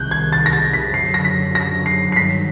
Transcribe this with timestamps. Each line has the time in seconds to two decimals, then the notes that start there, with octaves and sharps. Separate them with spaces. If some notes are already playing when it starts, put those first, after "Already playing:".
Already playing: C2 C3 D#3 F#6 G6
0.11 G#6
0.33 A6
0.46 A#6
0.53 A6
0.73 B6
0.94 F#2 D3 F#3 C7
1.14 A#6
1.24 B6
1.55 A#6
1.86 C7
2.12 C7
2.16 G2 D#3 F#3 B6